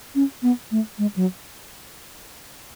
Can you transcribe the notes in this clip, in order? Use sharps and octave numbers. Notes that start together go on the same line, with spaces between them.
C#4
B3
A3
G#3
F#3